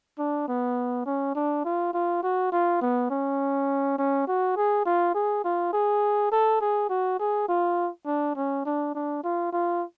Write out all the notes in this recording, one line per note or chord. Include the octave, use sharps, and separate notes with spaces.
D4
B3
C#4
D4
F4
F4
F#4
F4
B3
C#4
C#4
F#4
G#4
F4
G#4
F4
G#4
A4
G#4
F#4
G#4
F4
D4
C#4
D4
D4
F4
F4